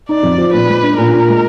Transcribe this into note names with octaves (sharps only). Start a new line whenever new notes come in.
D#4 D5
F2
F3
A#2 B4
G#3
D4
A#2 A#4
A#2
G#3